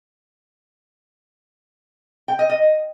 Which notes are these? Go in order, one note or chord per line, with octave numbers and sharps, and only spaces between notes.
G5
D#5
D#5